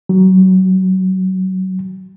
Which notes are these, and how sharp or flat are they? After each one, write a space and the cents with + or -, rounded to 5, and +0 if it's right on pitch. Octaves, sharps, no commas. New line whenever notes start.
F#3 +20